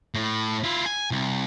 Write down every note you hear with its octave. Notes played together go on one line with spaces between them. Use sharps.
A2
E4 F4
G#5
C2